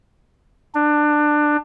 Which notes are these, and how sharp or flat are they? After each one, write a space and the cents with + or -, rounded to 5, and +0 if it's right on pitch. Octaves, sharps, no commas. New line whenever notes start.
D4 +20